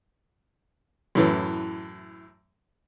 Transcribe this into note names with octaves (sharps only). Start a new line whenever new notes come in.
F#2 A2 E3